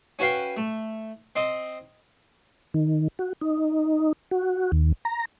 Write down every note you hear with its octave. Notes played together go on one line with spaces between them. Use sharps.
C#4 F#4 B4 F5 G5
A3
C4 D#5
D#3
F#4
D#4
F#4
D#2
A#5